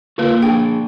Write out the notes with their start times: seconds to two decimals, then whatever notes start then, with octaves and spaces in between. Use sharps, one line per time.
0.18 D3 A#3 F4 A#4 B4
0.42 D4 G#4 G5